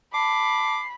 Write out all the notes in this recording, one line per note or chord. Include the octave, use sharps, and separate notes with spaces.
A5 B5 D6 C7